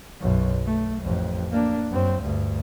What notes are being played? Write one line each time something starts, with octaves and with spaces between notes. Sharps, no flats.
B1 F#2
A3
A1 F2
A#3 D4
F#2 C4
D2 G2